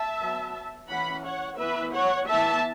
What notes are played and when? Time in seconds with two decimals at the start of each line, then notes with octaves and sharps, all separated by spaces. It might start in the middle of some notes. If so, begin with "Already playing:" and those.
Already playing: E5 A5
0.20 F#3 B3
0.89 E3 C#4 F#5 B5
1.25 C#5 F#5
1.59 E3 B3 B4 E5
1.94 C#5 F#5
2.28 E3 B3 E5 A5